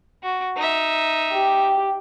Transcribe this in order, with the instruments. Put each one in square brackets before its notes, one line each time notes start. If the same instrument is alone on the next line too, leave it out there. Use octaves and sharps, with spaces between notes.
[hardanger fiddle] F#4
D#4 E5
[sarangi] G4